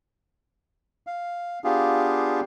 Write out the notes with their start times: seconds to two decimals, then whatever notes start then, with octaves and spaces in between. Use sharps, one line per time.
1.07 F5
1.64 B3 D4 F4 G4 G#4 F5